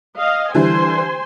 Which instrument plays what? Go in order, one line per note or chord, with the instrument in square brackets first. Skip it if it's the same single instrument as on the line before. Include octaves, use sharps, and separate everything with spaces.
[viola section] D#5 F5
[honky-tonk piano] D3 E3 G3 [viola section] C5 G#5 C6